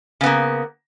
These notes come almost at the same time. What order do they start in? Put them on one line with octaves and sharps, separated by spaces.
C#3 B3 A#3